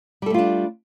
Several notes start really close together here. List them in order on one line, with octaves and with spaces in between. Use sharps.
G3 A4 A3 F4 D4